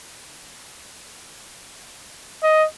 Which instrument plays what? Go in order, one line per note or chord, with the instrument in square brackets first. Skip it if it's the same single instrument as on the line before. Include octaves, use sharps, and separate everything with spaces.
[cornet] D#5